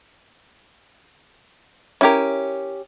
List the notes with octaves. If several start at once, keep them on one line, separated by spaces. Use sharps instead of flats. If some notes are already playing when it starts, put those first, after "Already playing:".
C#4 E4 G4 A#4